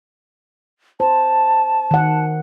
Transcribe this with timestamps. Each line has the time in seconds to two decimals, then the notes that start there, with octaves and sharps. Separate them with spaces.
1.00 C5 A5
1.91 D#3 F#5